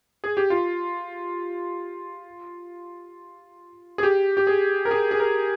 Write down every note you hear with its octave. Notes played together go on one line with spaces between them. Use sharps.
G#4
G4
F4
G#4
G4
G4
G#4
A#4
G#4
G#4
A#4